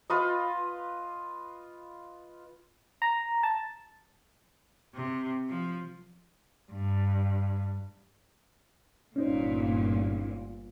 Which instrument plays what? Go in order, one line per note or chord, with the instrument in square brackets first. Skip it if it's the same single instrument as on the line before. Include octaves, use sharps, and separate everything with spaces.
[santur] F4 B4 D#5
[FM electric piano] A#5
A5
[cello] C3
F3
G2
[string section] G1 A#2 [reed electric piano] C#4 D#4 C5